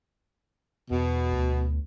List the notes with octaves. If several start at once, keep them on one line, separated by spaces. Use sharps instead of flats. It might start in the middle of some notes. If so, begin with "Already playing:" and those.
E2 B2
D2